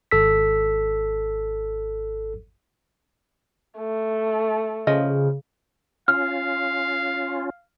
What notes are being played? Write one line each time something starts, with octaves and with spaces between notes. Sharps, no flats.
G#1 A4 E6 B6
A3
C#3 F3 D#5
C#4 F4 F5 F6